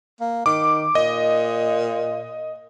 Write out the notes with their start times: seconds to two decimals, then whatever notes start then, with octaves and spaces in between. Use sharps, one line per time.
0.20 A#3
0.46 D#3 D6
0.95 A#2 D#5